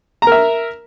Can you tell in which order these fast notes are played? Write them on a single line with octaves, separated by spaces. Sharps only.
A#5 A#4 E5